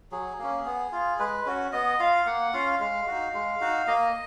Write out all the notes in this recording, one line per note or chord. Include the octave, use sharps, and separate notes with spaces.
F#3 G#4
A#3 C#4
B3
F4
G#3 B4
C#4 F#4
B3 D#5
F4 F5
A#3 F#5
C#4 F4 F5
G#3 F5
D#4 F#4
G#3
D#4 F#4
A#3 D#5